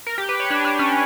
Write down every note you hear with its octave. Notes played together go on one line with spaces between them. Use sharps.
A#4
G4
B4
C#5
D4
D4
C#4